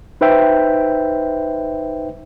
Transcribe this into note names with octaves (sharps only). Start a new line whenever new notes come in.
D#4 B4 C5 E5 G5